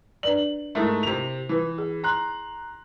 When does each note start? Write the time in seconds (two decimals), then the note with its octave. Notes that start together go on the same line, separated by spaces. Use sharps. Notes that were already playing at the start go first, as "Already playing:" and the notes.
0.23 D4 B4 D5 F#7
0.75 G#2 A3 E4 A#4 E5
1.03 C3 F7
1.49 E3 E4 B4
1.78 G#4
2.04 A#5 C6 F#6